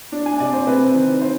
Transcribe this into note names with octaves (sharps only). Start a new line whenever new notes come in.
D4
G#5
C3 D5
C5
C4 B4
D#3
C5